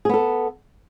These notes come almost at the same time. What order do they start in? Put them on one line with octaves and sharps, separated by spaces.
G#4 B3 A4